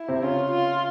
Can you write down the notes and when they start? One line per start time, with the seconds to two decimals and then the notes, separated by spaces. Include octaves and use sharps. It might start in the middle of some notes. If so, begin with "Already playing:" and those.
Already playing: E4
0.08 C3 C4
0.22 C#3 C#4 F4
0.51 F4